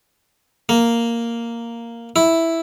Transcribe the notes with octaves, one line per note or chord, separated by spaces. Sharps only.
A#3
E4